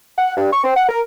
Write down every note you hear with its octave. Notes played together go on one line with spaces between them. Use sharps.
F#5
G2
C#6
C4
F#5
A#4